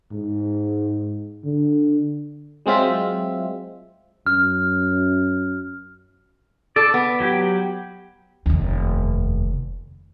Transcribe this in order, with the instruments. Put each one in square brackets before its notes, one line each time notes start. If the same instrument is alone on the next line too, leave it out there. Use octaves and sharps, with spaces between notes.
[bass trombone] G#2
D3
[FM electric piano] F#3 G#3 C4 F4 E5
[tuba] F#2 [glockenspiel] F6
[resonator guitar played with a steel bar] A4 [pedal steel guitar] D5
[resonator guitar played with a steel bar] B3
[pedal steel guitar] F#3 G4
[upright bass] F1 D#2